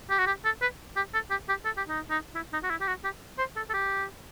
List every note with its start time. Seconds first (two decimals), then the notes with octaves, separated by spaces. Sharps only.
0.10 G4
0.18 F#4
0.27 G4
0.45 A4
0.62 B4
0.96 G4
1.14 A4
1.30 G4
1.49 G4
1.65 A4
1.77 G4
1.89 D#4
2.10 D#4
2.35 E4
2.53 D#4
2.63 F#4
2.70 E4
2.81 G4
2.87 F#4
3.04 G4
3.38 C5
3.56 A4
3.70 A4
3.73 G4